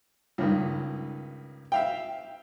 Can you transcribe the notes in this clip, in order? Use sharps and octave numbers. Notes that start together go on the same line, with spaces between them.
C#2 G2 D#3
E5 F5 G5